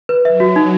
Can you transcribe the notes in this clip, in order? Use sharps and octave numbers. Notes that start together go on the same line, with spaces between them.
B4
F#3 E5
F#4
D#4